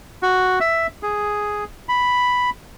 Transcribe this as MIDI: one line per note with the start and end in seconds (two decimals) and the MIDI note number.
0.23 0.59 66
0.60 0.87 76
1.03 1.64 68
1.89 2.50 83